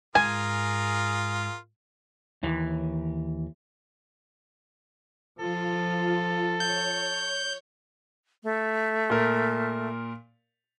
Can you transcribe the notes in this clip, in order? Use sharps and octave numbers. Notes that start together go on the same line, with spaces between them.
G#2 F4 G#4 A#4 G#5
D#2 E3
F3 F4 A4
C#5 G6
A3
A#2 A#4